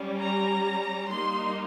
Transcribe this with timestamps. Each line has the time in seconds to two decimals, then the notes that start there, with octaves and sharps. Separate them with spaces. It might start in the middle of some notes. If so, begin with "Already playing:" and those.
Already playing: G3 C#4
0.20 A#5
1.09 G3 A#3 D#4 C6